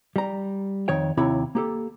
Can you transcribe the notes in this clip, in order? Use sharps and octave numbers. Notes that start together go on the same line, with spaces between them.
G3 A#5
F2 D#3 C#5 G5
D#2 C3 E4 C#5 B5
A#3 G4 A4